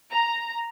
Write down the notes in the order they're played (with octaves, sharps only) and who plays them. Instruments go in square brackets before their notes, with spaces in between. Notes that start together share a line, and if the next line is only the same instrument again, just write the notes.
[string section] A#5